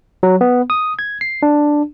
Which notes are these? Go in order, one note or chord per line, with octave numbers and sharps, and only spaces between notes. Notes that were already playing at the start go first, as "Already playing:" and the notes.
F#3
B3
D#6
G#6
C7
D4